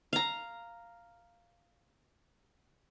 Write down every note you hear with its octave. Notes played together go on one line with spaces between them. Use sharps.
F5 A#5